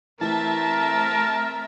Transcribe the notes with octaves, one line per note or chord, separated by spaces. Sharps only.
E3 A3 C4 A#4 E5 A5